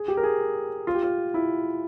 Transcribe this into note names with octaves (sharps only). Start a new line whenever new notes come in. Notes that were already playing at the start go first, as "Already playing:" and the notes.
Already playing: G#4
G4
A#4
G#4
F4
G4
F4
E4